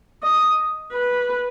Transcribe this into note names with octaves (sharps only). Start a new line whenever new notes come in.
D#5
B4